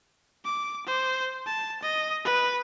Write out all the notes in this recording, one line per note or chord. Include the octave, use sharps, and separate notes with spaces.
D6
C5
A5
D#5
B4